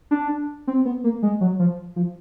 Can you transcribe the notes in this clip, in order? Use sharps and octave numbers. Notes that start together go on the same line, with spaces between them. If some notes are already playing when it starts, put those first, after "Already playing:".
D4
C4
B3
A#3
G#3
F#3
F3
F3